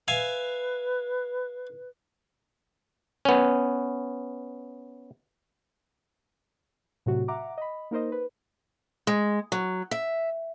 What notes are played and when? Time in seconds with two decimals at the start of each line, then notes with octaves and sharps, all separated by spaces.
0.08 B4 E5 F5 G#5
3.25 B3 C#4
7.06 A2 C3 F#3 F#4
7.28 E5 F#5 A#5 D6
7.58 D#5 B5
7.91 A#3 D#4 A#4 C5 D#5
8.12 B4
9.07 G#3
9.52 F#3
9.91 E5